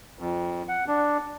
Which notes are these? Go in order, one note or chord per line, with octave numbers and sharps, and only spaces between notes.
F2
F#5
D4